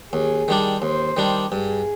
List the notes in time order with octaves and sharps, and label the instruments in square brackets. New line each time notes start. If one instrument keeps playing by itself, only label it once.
[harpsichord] D#2 [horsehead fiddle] G#4
[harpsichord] D#3 G3 D4
[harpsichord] D#2 [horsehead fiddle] C5
[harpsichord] D#3 G3 D4
[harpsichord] G2 [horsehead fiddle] G#4